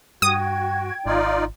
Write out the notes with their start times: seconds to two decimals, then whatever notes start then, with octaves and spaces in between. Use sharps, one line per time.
0.22 G2 F#4 G5 D#6 G#6
1.06 G#1 D#4 F4 D5